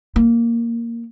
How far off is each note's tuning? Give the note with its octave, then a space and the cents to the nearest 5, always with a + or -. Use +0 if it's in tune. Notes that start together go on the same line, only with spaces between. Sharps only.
A#3 -5